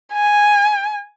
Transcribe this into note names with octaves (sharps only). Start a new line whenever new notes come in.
G#5